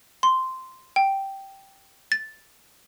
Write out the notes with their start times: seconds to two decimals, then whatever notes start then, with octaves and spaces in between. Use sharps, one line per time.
0.23 C6
0.96 G5
2.12 A6